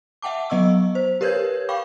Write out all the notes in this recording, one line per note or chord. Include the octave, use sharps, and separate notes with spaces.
E5 F#5 G5 A5 D6
F#3 B3 D#5 C#6 E6
C5
G4 A#4 B4 C#5 G6 G#6
F5 G5 B5 C#6 D6